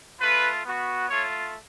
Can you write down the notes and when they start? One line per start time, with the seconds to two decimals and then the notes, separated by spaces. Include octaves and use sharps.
0.20 A3 F4 B4
0.65 B3 F#4
1.10 A3 F4 C#5